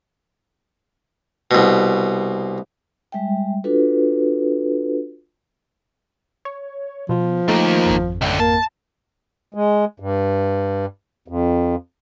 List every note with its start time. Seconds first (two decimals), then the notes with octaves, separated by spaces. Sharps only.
1.51 C2 B2
3.12 G3 G#3 E5 G5
3.64 D4 F4 F#4 A4 B4
6.45 C#5
7.09 B2 F3
7.48 D#3 A3 A#3
7.86 G#1 F2
8.21 C#2 D3
8.40 A#3 A5
9.54 G#3
10.00 G2
11.28 F2